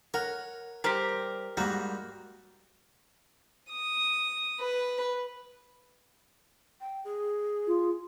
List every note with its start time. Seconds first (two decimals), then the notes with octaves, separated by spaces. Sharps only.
0.14 A#4 C#5 F#5
0.84 G3 G4 A#4 C5
1.57 G#2 G3 A#3 F#4
3.71 D#6
4.60 B4
6.81 G5
7.05 G#4
7.68 F4